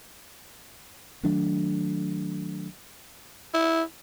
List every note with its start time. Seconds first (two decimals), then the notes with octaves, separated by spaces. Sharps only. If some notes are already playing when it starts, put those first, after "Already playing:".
1.23 D#3 F#3 A3 D4
3.54 E4